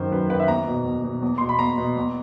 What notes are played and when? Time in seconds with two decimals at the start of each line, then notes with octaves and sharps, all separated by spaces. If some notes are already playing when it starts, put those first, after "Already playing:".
Already playing: F#2 D#3 C5
0.12 F#2 B4
0.30 D#3 B4
0.40 E5
0.48 E2 A#5
0.68 B2
0.85 E2
1.04 B2
1.22 E2
1.38 B2 C6
1.49 B5
1.59 E2 A#5
1.78 B2
1.97 E2